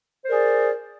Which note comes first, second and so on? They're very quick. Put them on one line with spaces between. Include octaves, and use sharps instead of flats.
C5 A#4 D5 G#4